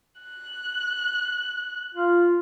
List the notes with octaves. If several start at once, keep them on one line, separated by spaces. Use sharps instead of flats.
F#6
F4